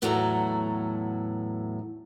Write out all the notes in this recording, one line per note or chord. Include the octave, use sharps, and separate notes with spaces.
E2 A2 F#3 F#4 A4 A#5